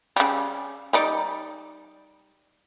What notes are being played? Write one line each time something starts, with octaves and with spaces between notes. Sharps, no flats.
C#3 G3
G3 D#4 D5